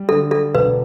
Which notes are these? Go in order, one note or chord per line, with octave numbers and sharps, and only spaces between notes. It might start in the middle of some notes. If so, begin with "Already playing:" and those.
Already playing: G3
D3 A4
A4
E1 B4